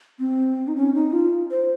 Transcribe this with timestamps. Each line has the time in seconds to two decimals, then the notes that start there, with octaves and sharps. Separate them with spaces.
0.19 C4
0.68 D#4
0.76 C#4
0.94 D#4
1.13 F4
1.51 C5